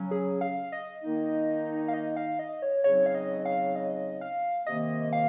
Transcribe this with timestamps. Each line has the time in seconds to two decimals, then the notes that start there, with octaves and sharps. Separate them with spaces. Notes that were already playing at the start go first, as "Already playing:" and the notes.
Already playing: C#3 F#3 C#4
0.11 G#4
0.41 F5
0.72 D#5
1.03 D#3 A#3 D#4
1.88 F5
1.94 D#5
2.16 F5
2.39 D#5
2.62 C#5
2.84 C#3 F#3 C4 D#4 C#5
3.06 F5
3.15 D#5
3.45 F5
3.76 D#5
4.21 F5
4.66 C3 D#3 A#3 D#5
5.13 F5